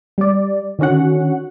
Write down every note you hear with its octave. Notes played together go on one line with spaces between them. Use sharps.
G3 D5
D3 D#3 C#4 F#4 F#5